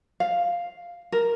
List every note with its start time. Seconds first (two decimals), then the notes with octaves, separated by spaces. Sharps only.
0.20 F5
1.12 A#4